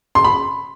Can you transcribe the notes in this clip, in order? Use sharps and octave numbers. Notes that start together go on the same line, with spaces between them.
C6
B5